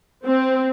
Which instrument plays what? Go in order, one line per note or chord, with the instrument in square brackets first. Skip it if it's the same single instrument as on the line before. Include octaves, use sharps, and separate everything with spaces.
[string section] C4